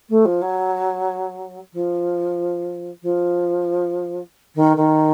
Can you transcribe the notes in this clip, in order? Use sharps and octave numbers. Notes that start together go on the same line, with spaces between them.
A3
F3
F#3
F3
F3
D#3
D#3